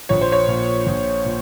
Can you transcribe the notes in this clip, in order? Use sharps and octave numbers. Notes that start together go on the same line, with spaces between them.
A#1 C#5
C5
C#5
A#2
A#1
A#2